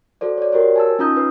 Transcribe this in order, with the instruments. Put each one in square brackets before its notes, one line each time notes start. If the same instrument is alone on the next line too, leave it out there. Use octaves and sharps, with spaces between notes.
[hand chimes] F#4 A4 C5 D5
C#5 D5
F#4 G4 A#4 C5 C#5
G#5 A5 E6
C#4 D#4 F4 A#5 D#6 G6
B4